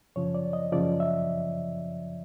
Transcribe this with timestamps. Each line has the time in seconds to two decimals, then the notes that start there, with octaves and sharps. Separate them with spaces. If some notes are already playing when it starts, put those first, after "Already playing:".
0.16 F#2 C#3 F3 C#5
0.35 D5
0.53 D#5
0.72 F#2 C#3 F3 D5
1.00 E5